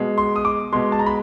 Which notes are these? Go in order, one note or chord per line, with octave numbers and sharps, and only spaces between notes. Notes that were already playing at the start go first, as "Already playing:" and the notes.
Already playing: B2 G#3
C6
D#6
D6
B2 G#3 C6
A5
A#5
B5